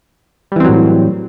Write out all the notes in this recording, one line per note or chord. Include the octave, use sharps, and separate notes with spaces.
A2 E3 F#3 G3 C4